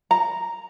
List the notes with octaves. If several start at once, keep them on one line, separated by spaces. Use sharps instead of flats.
A#5